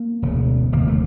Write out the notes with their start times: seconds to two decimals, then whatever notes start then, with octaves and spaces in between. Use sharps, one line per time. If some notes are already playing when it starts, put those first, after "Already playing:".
Already playing: A#3
0.22 E1 D2 C#3
0.72 F1 D#2 D3 A#3
0.88 A3